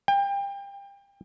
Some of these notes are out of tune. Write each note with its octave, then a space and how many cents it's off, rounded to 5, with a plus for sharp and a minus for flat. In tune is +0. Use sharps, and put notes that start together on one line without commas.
G5 +30